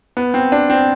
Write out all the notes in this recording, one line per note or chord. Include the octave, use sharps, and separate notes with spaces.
B3
C4
D4
C4